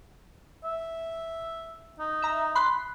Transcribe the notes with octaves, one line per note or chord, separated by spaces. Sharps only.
E5
D#4
E5 A#5
B5 C6 F#6